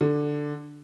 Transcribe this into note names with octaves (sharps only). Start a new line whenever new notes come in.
D3